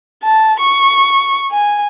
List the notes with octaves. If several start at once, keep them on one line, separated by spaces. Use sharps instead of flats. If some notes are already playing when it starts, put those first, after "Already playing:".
A5
C#6
G#5